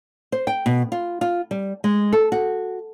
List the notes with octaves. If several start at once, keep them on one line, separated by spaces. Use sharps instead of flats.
C5
G5
B2
F4
F4
G3
G#3
A4
F#4